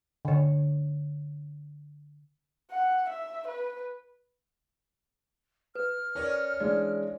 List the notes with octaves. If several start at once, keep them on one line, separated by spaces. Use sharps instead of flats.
D3 C#5
F#5
E5
B4
B4 F6
C#4 A#4 C#5 D5
E3 G#3 D4 D5